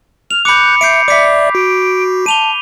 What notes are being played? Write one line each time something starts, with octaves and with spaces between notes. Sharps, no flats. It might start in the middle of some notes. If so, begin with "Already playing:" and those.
F6 F7
B5 D6 F#6 G6 C#7
E5 G6 C7 D7
D5 E5 D6 B6
F#4 D7
A5 D#7 F7 G7